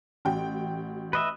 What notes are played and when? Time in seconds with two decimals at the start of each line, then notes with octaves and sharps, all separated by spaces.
0.25 A1 F#4 G5
1.13 B4 D#5 E5